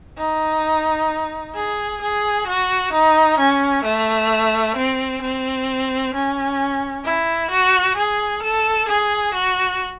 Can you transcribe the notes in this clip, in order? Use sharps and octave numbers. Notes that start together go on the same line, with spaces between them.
D#4
G#4
G#4
F#4
D#4
C#4
A3
C4
C4
C#4
E4
F#4
G#4
A4
G#4
F#4